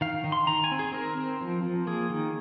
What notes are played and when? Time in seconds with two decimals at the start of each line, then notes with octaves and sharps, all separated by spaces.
0.01 D#3 F5
0.24 D#3
0.32 C6
0.47 D#3 A#5
0.64 G#5
0.72 C4
0.79 G#4
0.94 C4 A#4
1.17 C4
1.41 F3
1.63 F3
1.87 A#3 G#4
2.10 D#3